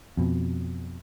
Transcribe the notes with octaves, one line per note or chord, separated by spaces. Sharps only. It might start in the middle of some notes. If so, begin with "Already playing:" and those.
F2 B2